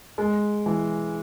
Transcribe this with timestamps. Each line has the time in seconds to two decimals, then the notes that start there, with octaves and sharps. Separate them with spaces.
0.18 G#3
0.66 E3